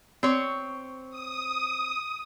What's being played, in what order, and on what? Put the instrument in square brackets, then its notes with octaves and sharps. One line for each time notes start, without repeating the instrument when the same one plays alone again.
[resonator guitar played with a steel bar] C4 C#5
[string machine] D#6